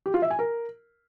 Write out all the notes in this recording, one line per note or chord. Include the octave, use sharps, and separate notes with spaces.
G4
F4
E5
G#5
A#4